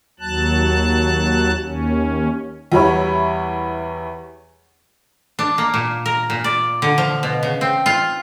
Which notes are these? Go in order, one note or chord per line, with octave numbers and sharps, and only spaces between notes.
D#2 F#3 A5 F#6
D#2 C#4
E2 G3 E4 C#5 B5
D4
A#3
A#2
A#4
A#2
D5
D3
F3
B2
C#3
C4
F4